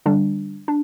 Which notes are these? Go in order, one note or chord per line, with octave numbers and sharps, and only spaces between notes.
D3 G3 D4
D4